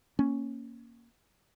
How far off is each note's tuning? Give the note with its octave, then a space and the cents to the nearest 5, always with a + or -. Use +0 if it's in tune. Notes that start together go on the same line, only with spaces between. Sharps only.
A#3 +0 C#4 +0